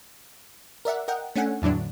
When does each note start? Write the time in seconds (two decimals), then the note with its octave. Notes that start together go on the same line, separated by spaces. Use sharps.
0.85 A#4 D5 E5 F#5
1.08 A#4 D#5 F#5 G5
1.36 A3 C#4 D4 F#5 G#5
1.62 E2 A2 D3 F#3 D4